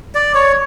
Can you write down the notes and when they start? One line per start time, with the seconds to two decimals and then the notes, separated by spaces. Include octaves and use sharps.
0.15 D5
0.34 C#5